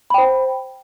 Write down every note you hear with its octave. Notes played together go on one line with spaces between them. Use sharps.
C5 G5 B5